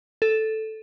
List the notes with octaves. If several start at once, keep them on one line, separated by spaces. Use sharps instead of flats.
A4